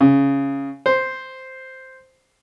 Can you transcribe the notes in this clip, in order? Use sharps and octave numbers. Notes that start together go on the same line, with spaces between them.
C#3
C5